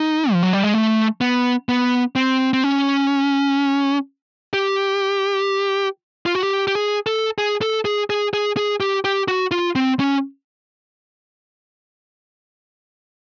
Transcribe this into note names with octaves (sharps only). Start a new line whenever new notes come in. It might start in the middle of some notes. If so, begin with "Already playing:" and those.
Already playing: D#4
F3
F#3
G3
G#3
A3
B3
B3
C4
C4
C#4
G4
F4
F#4
G4
G4
G#4
A4
G#4
A4
G#4
G#4
G#4
G#4
G4
G4
F#4
F4
C4
C#4